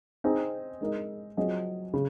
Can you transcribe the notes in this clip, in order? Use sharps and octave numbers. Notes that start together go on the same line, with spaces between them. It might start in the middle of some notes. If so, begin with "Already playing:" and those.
C4 D#4 G#4 D#5
G#3 D#4 A#4 D#5
F#3 C4 F4 G#4 D#5
C#3